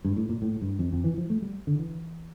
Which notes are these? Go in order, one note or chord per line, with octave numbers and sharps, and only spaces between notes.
G2
A2
A#2
A2
G2
F2
F2
E3
F3
A3
G3
D3
E3